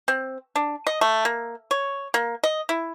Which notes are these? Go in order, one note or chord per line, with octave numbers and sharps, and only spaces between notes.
C4
D4
D#5
A3
A#3
C#5
A#3
D#5
E4